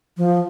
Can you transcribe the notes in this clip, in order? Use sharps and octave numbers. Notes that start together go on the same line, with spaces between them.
F3